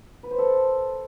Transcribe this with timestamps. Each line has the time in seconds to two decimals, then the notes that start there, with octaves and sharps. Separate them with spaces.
0.23 B4
0.31 C5
0.38 A4